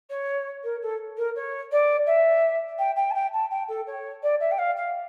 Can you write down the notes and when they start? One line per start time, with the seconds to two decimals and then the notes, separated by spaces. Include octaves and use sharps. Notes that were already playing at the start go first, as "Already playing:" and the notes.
0.10 C#5
0.63 A#4
0.82 A4
1.17 A#4
1.36 C#5
1.72 D5
2.06 E5
2.79 G5
2.96 G5
3.11 A5
3.14 G5
3.33 A5
3.51 G5
3.68 A4
3.87 C#5
4.23 D5
4.40 E5
4.51 G5
4.58 F5
4.76 F5